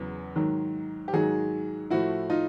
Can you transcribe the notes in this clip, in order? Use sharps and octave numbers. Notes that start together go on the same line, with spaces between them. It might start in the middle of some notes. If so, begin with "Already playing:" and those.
Already playing: E2 C#3 F#3 B3
G#2 D#3 F#3
G4
G#2 D#3 F#3 F#4 G#4
A2 F3 A3 E4 F#4
D#4 F4